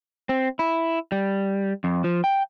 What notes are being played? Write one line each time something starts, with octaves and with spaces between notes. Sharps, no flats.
C4
E4
G3
F2
F3
G5